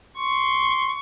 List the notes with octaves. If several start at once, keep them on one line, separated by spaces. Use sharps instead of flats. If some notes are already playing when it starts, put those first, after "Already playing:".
C6 C#6